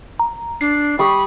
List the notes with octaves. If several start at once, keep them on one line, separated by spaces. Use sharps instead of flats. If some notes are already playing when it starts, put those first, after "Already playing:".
A#5
D4 C7
G3 B5 C#6 D#6